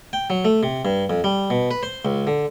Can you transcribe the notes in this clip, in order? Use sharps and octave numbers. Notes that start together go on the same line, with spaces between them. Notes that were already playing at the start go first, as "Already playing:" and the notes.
G5
F#3
A3
C3
G2
F2
G3
B2
B4
C5
C#2
D3